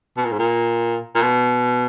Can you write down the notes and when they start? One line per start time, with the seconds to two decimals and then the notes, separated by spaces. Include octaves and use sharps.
0.17 B2
0.25 A#2
0.32 G#2
0.39 A#2
1.15 A#2
1.22 B2